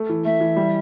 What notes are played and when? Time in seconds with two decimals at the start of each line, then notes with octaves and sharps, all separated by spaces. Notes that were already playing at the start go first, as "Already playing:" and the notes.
Already playing: A3
0.09 E3
0.25 A3 E5
0.40 E3
0.56 G3